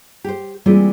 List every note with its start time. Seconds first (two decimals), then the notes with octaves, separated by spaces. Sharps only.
0.24 G4 C5
0.66 E3 G3 G#3 A#3 C4 F4